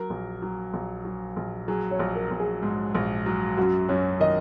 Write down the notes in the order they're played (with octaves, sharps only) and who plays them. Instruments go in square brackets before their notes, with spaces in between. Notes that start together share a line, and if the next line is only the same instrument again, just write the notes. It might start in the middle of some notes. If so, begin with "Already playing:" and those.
Already playing: [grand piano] F#3 [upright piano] A#4
[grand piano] A#1
F#3
A#1
F#3
A#1
[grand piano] F#3 [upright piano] G#4
[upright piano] C#5
[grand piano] A#1
[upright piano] A#4
[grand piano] A#1 [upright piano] F#4
[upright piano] G#4
[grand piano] G#2
A#1
F#3
[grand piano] F#2 [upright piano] F#4
[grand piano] F#2 [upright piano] C#4
[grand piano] D#3 [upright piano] D#5